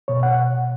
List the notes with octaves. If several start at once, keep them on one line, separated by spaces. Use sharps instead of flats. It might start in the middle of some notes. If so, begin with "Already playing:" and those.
B2 C#5
F#5